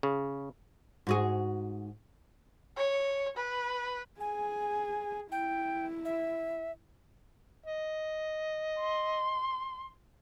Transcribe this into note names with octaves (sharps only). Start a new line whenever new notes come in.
C#3
G#2 F#4 G#4
C#5
B4
G#4 G#5
E4 G5
E5
D#5
C6